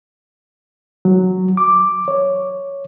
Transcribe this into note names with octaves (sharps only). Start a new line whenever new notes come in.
F#3
D6
C#5